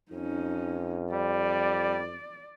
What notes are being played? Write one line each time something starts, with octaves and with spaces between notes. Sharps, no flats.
F2 C#4 D#4
G3 D5